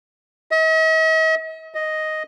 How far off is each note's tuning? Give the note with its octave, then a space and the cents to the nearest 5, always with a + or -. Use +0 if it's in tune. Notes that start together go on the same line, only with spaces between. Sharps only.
D#5 +45
D#5 +0